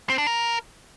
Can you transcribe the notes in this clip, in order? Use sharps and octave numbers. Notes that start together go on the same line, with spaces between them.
C4
D4
A#4